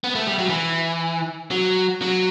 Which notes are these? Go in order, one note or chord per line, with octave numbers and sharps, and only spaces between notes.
B3
A3
G3
F#3
E3
F#3
F#3